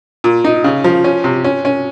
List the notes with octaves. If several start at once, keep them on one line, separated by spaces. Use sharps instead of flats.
A#2
D#4
C#3
F3
C#4
C3
C#4
C#4